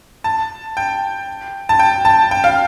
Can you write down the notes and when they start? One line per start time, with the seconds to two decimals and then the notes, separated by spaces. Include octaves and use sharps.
0.24 A5
0.77 G5
1.69 A5
1.79 G5
2.05 A5
2.31 G5
2.44 F5